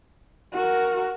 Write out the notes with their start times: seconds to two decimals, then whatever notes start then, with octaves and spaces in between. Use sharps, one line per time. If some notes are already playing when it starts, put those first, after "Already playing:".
0.53 F#4 A#4